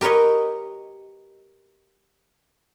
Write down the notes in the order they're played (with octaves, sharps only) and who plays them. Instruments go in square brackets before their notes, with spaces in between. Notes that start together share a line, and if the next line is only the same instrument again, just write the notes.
[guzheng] G4 A#4 B4 C#5 D#5